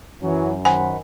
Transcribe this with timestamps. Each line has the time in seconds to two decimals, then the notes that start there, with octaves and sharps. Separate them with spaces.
0.22 F#2 E3 F#3 C#4
0.65 D#3 C5 F#5 G#5 B5